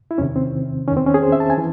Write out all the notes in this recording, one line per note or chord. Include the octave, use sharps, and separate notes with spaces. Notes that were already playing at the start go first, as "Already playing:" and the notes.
E4
E2 C3 D#3 C#4
C4
E2 D#3 C#4
C4
C#4
G#4
C5
E5
A5
G#5
E3